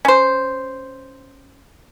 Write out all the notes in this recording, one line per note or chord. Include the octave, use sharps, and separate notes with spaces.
C#4 C5